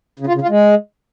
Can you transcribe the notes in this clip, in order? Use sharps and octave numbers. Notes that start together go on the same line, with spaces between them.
C#3
F4
C#3
F4
G#3